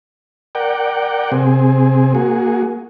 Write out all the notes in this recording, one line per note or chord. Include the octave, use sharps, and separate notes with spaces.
A#4 D5 F#5 G5
C3 C4 G#4
A#3 F#4 G#4